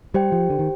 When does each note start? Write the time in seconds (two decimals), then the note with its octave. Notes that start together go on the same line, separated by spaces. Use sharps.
0.14 G3 G4 C5 G5
0.32 F3
0.50 D3
0.59 D#3